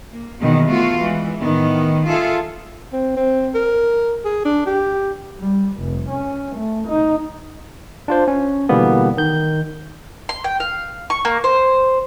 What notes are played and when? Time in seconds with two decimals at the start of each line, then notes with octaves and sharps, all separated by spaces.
0.11 A#3
0.41 E2 B2 D#3 F#3 A#3
0.69 A3 B3 F4 F#4
1.01 E3 G#3
1.40 A2 D#3 B3
2.07 F4 G#4 A4 E5
2.93 C4
3.16 C4
3.54 A#4
4.25 G#4
4.45 D4
4.66 G4
5.39 G3
5.78 F1
6.09 C#4
6.56 A3
6.88 D#4
8.08 D4 F4 C5
8.28 C#4
8.69 B2 D3 E3 G3 A#3 B3
9.17 D#3 G6
10.29 C6
10.44 G5
10.60 F5
11.10 C#6
11.25 A#3
11.44 C5